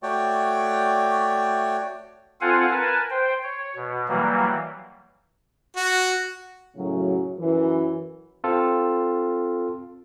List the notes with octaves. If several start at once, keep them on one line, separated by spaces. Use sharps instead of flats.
A3 F#4 C#5 D5 G5
C4 F4 A4 F5 F#5 G#5
A#4 B4 G#5 A5
C5 G5
C#5
B2
E3 F#3 G3 A#3
F#4
F#2 A2 C#3 F#3
F#2 E3
C4 F4 A4